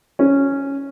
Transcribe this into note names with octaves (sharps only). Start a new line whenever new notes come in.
C#4